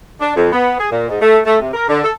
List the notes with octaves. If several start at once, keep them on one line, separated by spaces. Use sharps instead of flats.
D4
F2
B3
G#4
A#2
G#2
A3
A3
C3
A#4
D3
A4